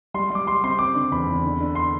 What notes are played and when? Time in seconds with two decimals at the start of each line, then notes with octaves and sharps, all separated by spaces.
0.14 G3 C6
0.30 G3 D6
0.47 G3 C6
0.63 C4 C6
0.79 C4 D6
0.95 D3
1.11 E2 B5
1.27 E2
1.44 D3
1.60 D3
1.75 C6